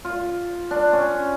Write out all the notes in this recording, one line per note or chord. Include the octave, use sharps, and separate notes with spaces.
F4
D4
C#4